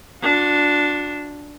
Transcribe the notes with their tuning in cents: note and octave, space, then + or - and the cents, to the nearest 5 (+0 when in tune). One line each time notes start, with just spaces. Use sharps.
D4 +0 F#4 -40